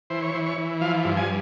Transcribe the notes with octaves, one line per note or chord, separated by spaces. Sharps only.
E3 C5
C#5
E3 C5
C#5
E3
F3 F5
G2
G#5